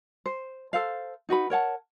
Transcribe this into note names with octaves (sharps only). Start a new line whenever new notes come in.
C5
A4 C5 F5
D#4 F#4 B4 B5
A#4 C#5 F#5 A5